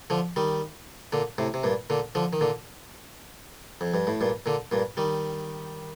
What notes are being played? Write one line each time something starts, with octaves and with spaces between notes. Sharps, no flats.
D3 F3
D#3 G3
A#2 D3
A2 C3
C3
G2 A#2
A#2 D3
D3 F3
D#3
A#2 D3
F2
G2
A2
G2 A#2
A#2 D3
G2 A#2
D#3 G3